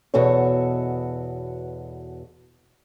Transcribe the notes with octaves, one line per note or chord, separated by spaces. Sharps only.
E2 B2 F#4 A4 C#5